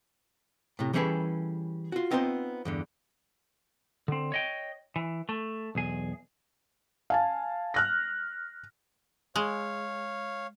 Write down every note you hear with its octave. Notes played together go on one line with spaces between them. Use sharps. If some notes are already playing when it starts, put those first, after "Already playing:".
A2 C3
E3 G3 C#4 G#4 A4 B4
F4 F#4
B3 C4 D#4 F4 A4 C5
E2 G2 D3
D3 C4
C#5 D#5 G5
E3
A3
B1 E2 G#4
F5 G#5 A5
F6 F#6 A#6
G#3 C#5 F5